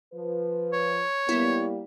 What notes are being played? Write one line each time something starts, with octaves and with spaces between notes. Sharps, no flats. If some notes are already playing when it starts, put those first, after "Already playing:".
F3 B4
C#5
G3 A#3 B3 E4